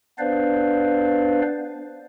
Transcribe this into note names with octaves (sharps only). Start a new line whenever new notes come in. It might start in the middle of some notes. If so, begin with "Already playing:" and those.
B3 D4 B4 C5 D5 F5